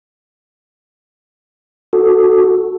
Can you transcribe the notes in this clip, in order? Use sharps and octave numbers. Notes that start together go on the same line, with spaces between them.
F#4 A4